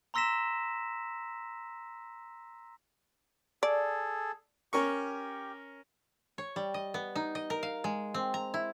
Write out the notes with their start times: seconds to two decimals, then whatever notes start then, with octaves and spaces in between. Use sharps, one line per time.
0.14 A#5 C6 E6 A#6 B6 E7
3.63 G#4 A4 D5
4.73 C#4 G4 A#4 C#6
6.38 C#5
6.56 G3
6.74 D#5
6.94 B3
7.15 D#4
7.35 D#5
7.50 A#4
7.63 F5
7.84 G#3
8.14 C4
8.34 A#5
8.54 E4